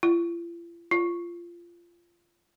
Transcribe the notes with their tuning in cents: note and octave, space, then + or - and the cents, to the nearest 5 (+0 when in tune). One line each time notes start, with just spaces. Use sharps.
F4 -45
F4 -20